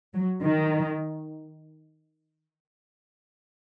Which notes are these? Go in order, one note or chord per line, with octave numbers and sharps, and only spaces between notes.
F#3
D#3